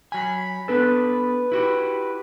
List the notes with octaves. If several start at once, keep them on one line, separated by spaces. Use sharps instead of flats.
F#3 G#5 B5
B3 D4 A4 B4
E4 F#4 G4